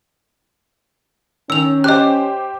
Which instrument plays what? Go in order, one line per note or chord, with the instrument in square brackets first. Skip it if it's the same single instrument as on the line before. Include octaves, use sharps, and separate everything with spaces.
[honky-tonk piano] D#3 [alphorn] C#4 [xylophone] E6 F7
[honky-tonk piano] G4 C5 D6 [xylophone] D#5 F#6